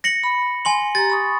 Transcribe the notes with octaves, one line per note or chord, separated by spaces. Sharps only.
A#6 C#7 F#7
B5
G#5 C6 F#7
G4 A#5 A6
B5 C#6 D#6